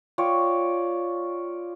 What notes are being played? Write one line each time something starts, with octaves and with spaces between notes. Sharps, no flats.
F4 C#5 D5 G5